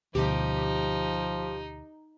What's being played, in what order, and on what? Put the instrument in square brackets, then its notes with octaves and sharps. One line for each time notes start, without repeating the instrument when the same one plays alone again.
[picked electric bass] D2 B2 [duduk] F3 [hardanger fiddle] D#4 [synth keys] G4